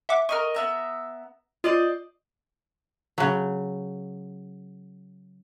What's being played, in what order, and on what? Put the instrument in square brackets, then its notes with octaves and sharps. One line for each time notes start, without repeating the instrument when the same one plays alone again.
[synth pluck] E5 F#5 D6
[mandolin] A#4 B4 D#5 [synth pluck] C#6 F6
[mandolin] B3 E5 A#5
[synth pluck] F4 [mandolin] C5 D5 D#5
[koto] C#3 F#3